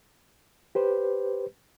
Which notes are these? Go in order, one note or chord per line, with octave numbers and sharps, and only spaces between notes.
G4 B4 C5